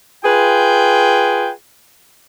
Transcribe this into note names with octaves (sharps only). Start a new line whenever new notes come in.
F4 G#4 B4 G5